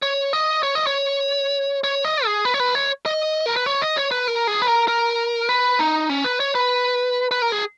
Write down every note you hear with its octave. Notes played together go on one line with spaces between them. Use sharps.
C#5
D#5
C#5
D#5
C#5
C#5
D#5
G#4
B4
C#5
B4
C#5
D#5
A#4
B4
C#5
D#5
C#5
B4
A#4
G#4
B4
A#4
A#4
B4
D#4
C#4
B4
C#5
B4
B4
A#4
G#4